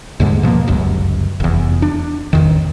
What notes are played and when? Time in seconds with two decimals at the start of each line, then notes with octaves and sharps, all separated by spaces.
0.20 D#2 G#2 D3 G#3
0.43 B2 F3 F#3 A#3
0.68 G1 C#2 F#2
1.40 F1 E2
1.82 D4
2.33 A1 E2 D#3